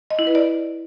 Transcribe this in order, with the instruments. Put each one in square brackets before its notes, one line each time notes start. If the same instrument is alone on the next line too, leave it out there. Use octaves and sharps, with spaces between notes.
[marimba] D#5
E4
B4
D5